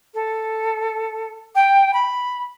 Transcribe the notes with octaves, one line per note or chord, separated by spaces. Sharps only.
A4
G5
B5